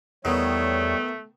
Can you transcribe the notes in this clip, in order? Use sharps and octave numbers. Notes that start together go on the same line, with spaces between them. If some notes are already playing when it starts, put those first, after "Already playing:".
E2 B2 D#3 G3 A3 C#5